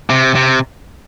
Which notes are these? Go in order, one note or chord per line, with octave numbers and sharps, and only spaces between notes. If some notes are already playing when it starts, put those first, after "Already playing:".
C3
C3